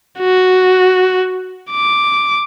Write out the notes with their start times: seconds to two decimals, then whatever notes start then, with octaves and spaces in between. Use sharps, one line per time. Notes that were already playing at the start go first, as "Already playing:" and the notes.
0.20 F#4
1.71 D6